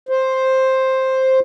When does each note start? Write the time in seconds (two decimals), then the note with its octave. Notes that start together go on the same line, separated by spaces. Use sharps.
0.09 C5